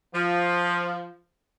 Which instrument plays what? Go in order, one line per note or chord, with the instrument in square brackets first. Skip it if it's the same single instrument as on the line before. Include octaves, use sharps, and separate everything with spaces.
[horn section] F3